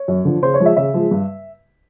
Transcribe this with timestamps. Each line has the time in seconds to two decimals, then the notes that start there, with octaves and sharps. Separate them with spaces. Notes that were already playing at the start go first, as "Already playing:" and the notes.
Already playing: C#5
0.08 F#2
0.25 D3 F3
0.42 C#3 C5
0.54 C#5
0.60 F3 G#3
0.66 E5
0.77 C#3 E5
0.94 F3 G#3
1.11 G2